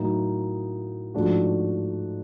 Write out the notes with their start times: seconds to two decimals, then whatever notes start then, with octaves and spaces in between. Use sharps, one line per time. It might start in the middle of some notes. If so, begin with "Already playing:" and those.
Already playing: A2 F#3 A#3 D#4
1.14 G#2 F3 A3 D4 F#4